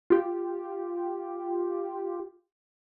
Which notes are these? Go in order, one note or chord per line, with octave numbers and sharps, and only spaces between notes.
F4 G4